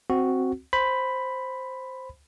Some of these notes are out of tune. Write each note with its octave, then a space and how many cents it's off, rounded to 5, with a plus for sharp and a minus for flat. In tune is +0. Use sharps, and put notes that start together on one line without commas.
C4 +0 F#4 +0
C5 +0 B5 +5